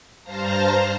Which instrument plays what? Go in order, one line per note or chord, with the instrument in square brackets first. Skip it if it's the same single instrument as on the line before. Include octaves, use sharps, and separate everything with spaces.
[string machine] G2 C5 F5 A5 A#5 A#6